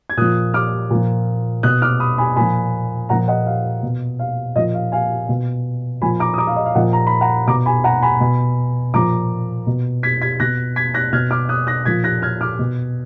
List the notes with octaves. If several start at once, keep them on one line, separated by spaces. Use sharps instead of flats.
G#6
A#2 F3 D#6 F#6
D6 F6
A#2 F3
B2 D#6 F#6
D6 F6
B5 D#6
G#5 B5
A#2 F3 G#5 B5
A#2 F3 F#5 A#5
D#5 F#5
F5
B2
F5
A#2 F3 D#5
F5
F5 G#5
B2
A#2 F3 G#5 B5
A#5 D6
D#6
A#5 D6
F5
D#5
F5
A#2 F3 D#5 F#5
A#5
B5
F#5 A#5
B2 A#5 D6
G#5 B5
F#5 A#5
G#5 B5
B2
A#2 F3 A#5 D6
B2
G#6 B6
G#6 B6
B2 F#6 A#6
G#6 B6
F#6 A#6
B2 F6 G#6
D6 F6
D#6 F#6
F#6 A#6
A#2 F3 G#6 B6
F#6 A#6
F6 G#6
D6 F6
B2